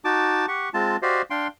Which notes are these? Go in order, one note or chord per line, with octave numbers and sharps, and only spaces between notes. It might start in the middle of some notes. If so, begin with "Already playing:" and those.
D#4 F#4 A5 D6
G4 F#5 C#6
G#3 C4 F4 A5
F#4 G4 C5 D5 D#5 F5
D4 F5 G5 C6